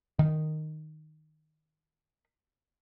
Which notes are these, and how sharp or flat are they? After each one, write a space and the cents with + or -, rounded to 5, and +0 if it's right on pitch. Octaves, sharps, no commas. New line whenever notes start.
D#3 -5